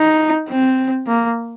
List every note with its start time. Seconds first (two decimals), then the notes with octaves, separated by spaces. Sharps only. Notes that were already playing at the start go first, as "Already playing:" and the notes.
Already playing: D#4
0.49 C4
1.07 A#3